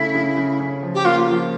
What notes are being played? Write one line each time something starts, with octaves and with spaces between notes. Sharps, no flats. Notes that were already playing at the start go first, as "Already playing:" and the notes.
Already playing: C#3 A3 E4
C#3
C#3
C#4
F3
G4
A#3 F4
F3